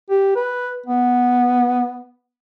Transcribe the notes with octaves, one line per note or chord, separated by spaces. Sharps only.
G4
B4
B3